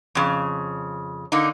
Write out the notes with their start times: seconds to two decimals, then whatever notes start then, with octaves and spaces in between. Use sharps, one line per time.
0.15 F2 C#3
1.32 D3 A#3 D#4